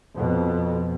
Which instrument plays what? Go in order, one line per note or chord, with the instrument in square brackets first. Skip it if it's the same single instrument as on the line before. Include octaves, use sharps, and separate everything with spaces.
[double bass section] F2 B2